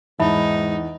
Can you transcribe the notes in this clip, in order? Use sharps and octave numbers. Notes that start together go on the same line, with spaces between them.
E2 G#2 D#4 E5 A5 B5